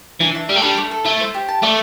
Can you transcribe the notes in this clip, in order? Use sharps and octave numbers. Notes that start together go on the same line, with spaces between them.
E3 D4
E5
G3 G4
A3
G3 D4
A3
A4
A3 E4
C5
G4
A5
A3 D5